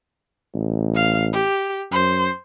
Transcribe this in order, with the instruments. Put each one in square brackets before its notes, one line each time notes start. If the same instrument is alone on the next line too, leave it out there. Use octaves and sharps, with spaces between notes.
[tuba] A1
[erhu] F5
G4
[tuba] F#2 [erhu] C5